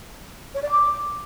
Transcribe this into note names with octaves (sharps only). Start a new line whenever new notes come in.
C#5
D5
D6